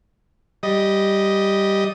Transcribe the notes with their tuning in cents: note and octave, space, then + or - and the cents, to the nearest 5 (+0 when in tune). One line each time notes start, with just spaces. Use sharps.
G3 +0 D#5 +0